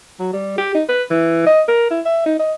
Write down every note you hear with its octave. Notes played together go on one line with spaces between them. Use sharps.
F#3
G3
G4
D#4
B4
E3
D#5
A#4
E4
E5
D#4
D#5